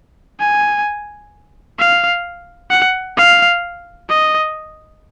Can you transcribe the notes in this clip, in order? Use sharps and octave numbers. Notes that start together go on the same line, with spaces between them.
G#5
F5
F#5
F5
D#5